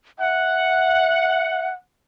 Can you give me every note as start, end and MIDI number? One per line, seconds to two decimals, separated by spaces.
0.19 1.66 76
0.19 1.76 78